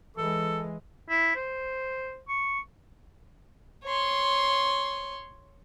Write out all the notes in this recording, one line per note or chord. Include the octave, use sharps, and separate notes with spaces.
E3 G#3 A4
E4
C5
C#6
C#5 C6